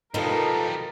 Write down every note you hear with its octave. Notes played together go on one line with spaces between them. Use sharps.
B2 D#3 F3 G3 D#4 F4 A4 A#4